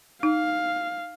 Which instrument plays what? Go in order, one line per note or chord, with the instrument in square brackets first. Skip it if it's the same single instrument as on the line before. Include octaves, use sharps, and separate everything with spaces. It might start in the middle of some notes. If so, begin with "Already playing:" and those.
[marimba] D#4 [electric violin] F5